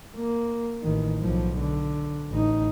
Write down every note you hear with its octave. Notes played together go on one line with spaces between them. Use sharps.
A#3
A1 D#3
B1 F3
D3
A1 D#4